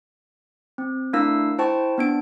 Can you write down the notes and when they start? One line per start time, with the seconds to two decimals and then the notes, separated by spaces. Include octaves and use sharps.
0.78 C4
1.13 A3 D4 E4 A#4 F5 E6
1.59 E4 C5 G5 A5 C#6
1.98 B3 D4 D7